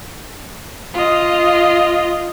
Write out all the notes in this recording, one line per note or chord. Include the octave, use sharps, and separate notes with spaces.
F4 D#5